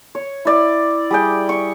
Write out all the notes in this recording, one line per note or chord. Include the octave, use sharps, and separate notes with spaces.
C#5
E4 D5
G3 G#4 G5
C#6